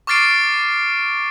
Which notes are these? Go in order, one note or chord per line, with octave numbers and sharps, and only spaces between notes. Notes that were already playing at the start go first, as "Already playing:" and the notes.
C#6 D6 F6 A6 C7 D7